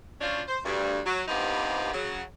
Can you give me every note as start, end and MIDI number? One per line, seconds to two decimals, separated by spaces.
0.21 0.42 53
0.21 0.42 54
0.21 0.42 61
0.21 0.42 62
0.21 0.42 65
0.21 0.42 72
0.47 0.58 72
0.65 0.99 38
0.65 0.99 43
1.06 1.24 54
1.28 1.90 43
1.28 1.90 48
1.28 1.90 53
1.28 1.90 58
1.28 1.90 59
1.28 1.90 63
1.93 2.22 49
1.93 2.22 54